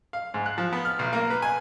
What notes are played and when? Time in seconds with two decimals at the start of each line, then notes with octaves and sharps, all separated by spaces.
0.13 F5
0.34 G#2
0.46 F#6
0.58 F3
0.73 B3
0.85 F6
0.99 B1
1.13 A#3
1.30 B4
1.42 G#5